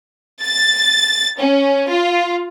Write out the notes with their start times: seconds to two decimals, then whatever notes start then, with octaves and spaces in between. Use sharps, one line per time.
0.43 A6
1.39 C#4
1.89 F4